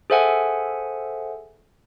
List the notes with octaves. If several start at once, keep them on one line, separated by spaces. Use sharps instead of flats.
G#4 A4 C5 E5 F#5 G#5